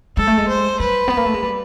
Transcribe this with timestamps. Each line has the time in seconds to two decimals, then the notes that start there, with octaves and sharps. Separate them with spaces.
0.17 G#3 A4
0.27 A3
0.38 G#3
0.48 C5
0.80 G3 B4
1.08 B3
1.17 A#3
1.26 A3
1.34 G#3
1.43 G3